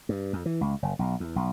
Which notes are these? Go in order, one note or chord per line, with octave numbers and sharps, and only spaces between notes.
G2
F2
E3
C#2
F#1
B1
E2
B1